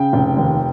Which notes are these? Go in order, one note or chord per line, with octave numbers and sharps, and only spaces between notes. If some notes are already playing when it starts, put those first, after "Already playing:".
Already playing: C#3 G5
F1
D#2